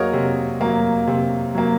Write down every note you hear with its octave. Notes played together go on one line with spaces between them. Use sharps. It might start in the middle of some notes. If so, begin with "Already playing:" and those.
Already playing: F#3 A#3 F#4 G#4 A#4 C#5 D#5
C3
F#3 A#3
C3
F#3 A#3